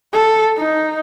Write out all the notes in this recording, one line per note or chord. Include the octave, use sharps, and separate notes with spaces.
A4
D#4